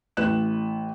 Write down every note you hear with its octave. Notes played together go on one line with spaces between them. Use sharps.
A1 B4 F#6 E7